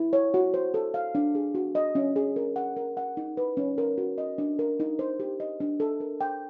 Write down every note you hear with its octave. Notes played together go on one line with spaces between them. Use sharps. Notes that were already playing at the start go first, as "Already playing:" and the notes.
Already playing: E4
C#5
F#4
C5
A4
F5
D4
G#4
F#4
D#5
C#4
G#4
A#4
F#5
A#4
F#5
D#4
B4
C#4
A#4
F#4
D#5
D4
A#4
D#4
C5
G4
D#5
D4
A4
A#4
G5